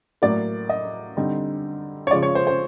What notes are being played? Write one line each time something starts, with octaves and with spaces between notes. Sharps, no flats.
A2 F#3 A#3 D5
D#5
D3 G3 C4 D#4
C#5
C#3 F3 G#3 D5
C#5
C5
C5